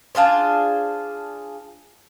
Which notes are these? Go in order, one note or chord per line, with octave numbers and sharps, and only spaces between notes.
D4 F4 G#4 C5